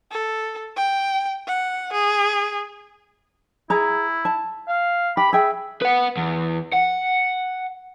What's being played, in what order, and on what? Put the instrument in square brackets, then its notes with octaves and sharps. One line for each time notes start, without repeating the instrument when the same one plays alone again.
[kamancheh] A4
G5
F#5
G#4
[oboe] E4 [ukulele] G#4 A#5
[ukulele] A5
[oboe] F5
[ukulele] G4 [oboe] B5
[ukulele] G#4 G5 [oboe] E5
[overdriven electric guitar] B4 F#5
E2
F#5